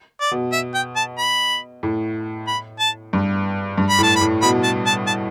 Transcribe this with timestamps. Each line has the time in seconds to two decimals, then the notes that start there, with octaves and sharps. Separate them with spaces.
0.21 D5
0.31 B2
0.53 E5
0.75 G5
0.96 A5
1.18 B5
1.83 A2
2.48 B5
2.80 A5
3.13 G2
3.78 G2
3.90 B5
3.99 A2
4.03 A5
4.16 B5
4.21 A2
4.42 B2 B5
4.64 A5
4.86 A5
5.07 A5